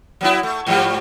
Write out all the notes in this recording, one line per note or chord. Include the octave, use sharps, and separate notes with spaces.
F#3 B3 E4
A3
G#2 F3 G3